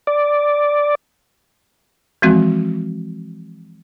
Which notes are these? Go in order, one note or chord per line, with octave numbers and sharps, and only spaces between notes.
D5
E3 F3 G#3 C4 F#4